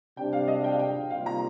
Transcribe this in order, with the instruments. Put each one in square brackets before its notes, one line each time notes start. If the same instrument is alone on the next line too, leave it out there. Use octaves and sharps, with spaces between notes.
[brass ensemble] C3 G3 D4 [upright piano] G5
[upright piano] F5
D#5
G5
F5
G5
[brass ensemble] C3 D#3 G3 A#3 F4 [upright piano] F5
[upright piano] A#5